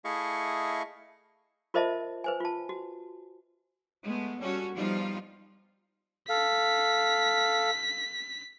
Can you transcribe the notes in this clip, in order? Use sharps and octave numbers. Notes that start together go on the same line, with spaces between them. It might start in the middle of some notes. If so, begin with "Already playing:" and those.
A3 E4 G#4 D#5 F5 C#6
F4 A#4 C5 D#5 E5 A5
B4 C5 G#5
F4 A5
F#4
G#3 A3 B3
G3 C#4 F#4 A4 C#5
F3 G3 B3 D#4 F4
A4 F5 B6